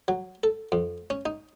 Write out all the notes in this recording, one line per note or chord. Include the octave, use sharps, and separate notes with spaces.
F#3
A4
F2
C#4
D#4